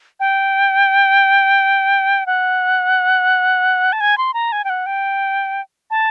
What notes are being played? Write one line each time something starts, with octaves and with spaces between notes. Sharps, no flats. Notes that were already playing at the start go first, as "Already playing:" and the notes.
G5
F#5
A5
G#5
C6
A#5
G#5
G5
F#5
G5
A5